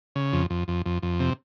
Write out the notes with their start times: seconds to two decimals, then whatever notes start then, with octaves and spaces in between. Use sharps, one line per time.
0.16 C#3
0.33 F2
0.50 F2
0.68 F2
0.86 F2
1.02 F2
1.20 C3